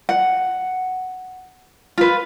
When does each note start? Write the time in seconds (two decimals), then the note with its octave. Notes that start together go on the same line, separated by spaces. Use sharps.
0.09 F#5
1.98 F4 B4